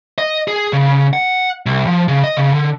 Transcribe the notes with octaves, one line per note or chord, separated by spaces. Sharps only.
D#5
G#4
C#3
F#5
C2
F3
C#3
D#5
C#3
D3